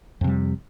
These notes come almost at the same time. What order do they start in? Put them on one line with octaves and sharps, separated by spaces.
F2 C3 G3